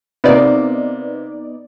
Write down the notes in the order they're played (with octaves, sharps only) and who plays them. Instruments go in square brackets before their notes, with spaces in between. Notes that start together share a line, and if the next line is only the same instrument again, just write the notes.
[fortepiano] C3 A#3 [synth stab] B3 D#4 D5